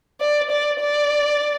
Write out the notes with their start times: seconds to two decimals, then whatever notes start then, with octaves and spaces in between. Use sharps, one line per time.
0.21 D5
0.50 D5
0.80 D5